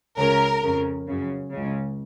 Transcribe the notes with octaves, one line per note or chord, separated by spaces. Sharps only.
C#2 C#3 A#4
F2 C#3
F#2 C#3
C#2 C#3